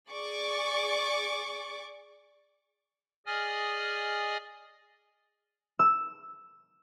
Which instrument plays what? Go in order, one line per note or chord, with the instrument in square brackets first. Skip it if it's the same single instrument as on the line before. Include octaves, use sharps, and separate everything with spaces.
[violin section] G#4 D5 C#6 D6
[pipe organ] G#4 D5 D#5 G#5 D#6 F6
[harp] E6